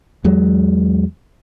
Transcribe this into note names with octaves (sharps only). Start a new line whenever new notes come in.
E2 F#3 G#3